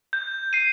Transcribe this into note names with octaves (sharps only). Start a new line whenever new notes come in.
G6
C7 D#7